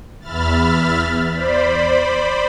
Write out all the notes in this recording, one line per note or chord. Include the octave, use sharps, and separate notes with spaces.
E2 E5 B5 F6 A6
C5 D5 B5